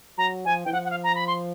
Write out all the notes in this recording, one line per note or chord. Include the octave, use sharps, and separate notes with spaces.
F#3 A#5
F3 G#5
E3 G5
F3 F#5
F#5
F5
A#5
B5
C6